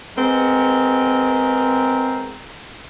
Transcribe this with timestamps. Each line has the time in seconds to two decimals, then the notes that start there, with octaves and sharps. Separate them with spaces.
0.17 G#3 B3 C4 A#4